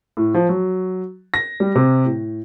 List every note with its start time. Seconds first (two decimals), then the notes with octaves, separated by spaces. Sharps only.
0.17 A2
0.34 F3
0.49 F#3
1.34 A#6
1.60 G3
1.75 C3
2.05 A2